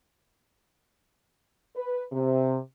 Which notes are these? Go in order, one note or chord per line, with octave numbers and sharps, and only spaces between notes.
B4
C3